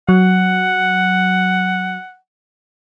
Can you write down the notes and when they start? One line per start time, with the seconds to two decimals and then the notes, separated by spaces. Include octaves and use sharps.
0.09 F#3 F#5